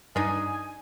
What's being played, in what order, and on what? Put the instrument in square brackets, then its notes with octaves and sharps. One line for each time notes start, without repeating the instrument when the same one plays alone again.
[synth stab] G2 [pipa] D4 D#4 [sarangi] G#5 [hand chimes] D#6